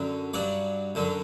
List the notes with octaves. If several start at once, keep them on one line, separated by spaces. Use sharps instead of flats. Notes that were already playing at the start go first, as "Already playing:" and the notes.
Already playing: F#2 D3 F#3
G2 F#3 D5 F#5
F#2 D3 F#3